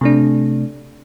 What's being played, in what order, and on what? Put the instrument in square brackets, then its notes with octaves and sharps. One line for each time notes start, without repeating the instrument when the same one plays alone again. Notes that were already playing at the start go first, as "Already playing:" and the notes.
[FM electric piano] C3 A3 D4